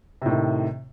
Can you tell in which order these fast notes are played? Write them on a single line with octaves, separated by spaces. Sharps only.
C3 A2 D#3